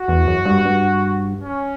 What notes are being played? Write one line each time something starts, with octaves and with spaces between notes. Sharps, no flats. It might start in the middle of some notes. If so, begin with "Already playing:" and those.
Already playing: F#4
E2
F#2
G2
G2
C#4